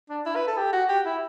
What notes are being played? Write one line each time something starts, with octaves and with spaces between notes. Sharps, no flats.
D4
E4
B4
A4
G4
F#4
G4
E4